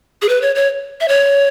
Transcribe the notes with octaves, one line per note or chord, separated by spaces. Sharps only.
G#4
B4
C#5
C#5
E5
C#5